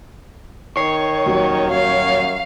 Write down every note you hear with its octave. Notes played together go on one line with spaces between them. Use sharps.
D#3 C#5 C7
D#1 F#3 F#4
F#2 F5